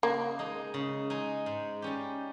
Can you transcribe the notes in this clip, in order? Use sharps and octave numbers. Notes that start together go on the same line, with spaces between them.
C#3 A#3
G#3 D#4 G#4
C#3
G#3 D#4 G#4
G#2
G3 C#4 G4